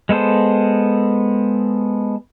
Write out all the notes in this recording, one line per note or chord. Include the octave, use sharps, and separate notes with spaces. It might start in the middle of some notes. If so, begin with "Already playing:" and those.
G#3 B3 A4 C5